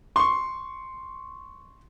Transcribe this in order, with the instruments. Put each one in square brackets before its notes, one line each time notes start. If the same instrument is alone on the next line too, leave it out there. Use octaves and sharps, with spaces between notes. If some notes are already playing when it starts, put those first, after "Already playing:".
[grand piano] C6 C#6